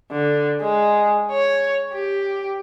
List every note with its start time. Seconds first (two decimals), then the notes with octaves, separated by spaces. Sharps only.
0.11 D3
0.61 G#3
1.31 C#5
1.93 G4